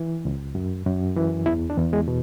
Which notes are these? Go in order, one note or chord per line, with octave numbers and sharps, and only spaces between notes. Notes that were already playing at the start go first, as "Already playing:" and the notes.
Already playing: E3
C#2
F#2
F#2
E3
E2 E4
D4
E2
G#3
B2